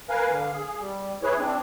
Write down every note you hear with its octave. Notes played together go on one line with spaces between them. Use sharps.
A#4 B4 F5 G#5
D3 F5
G#4
G3
E4 G#4 B4 C#5
C4 D4